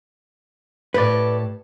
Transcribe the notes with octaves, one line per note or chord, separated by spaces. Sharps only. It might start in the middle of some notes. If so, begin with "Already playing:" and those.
A2 G4 A4 B4 D5